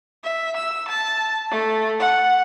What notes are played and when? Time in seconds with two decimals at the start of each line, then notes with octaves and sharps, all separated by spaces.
0.24 E5
0.56 E6
0.88 A5
1.51 A3
2.00 F#5